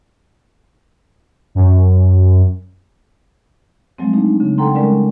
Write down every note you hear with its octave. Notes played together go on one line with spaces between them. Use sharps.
F#2
F3 F#3 G#3 A3 C4
A3 D4 D#4
C#3
A4 F#5 G5 A#5 C6
G3 G#3 C#4 A#4 D5